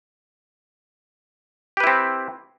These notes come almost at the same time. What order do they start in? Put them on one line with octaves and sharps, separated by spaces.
G4 B4 E4 C4